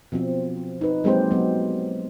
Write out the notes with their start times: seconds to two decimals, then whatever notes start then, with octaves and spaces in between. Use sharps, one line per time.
0.12 B2 F3 C4
0.81 D#4 B4
1.04 F#3 G#3 A#3 C4 G4 C5
1.31 F#3 B3